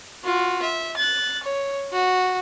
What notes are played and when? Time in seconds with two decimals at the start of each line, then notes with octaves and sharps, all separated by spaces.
0.24 F4 F#4
0.62 E5
0.96 F#6 A6
1.43 C#5
1.92 F#4